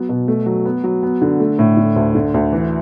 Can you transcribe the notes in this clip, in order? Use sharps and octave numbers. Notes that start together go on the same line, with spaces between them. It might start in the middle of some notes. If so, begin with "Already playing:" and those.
Already playing: F#3 B3
B2
A3
F#3
B3
F#3
B3
D3
A3
A2
D3
D2
D3
D2
E3